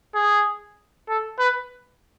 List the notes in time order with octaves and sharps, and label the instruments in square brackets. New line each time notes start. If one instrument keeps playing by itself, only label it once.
[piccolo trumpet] G#4
A4
B4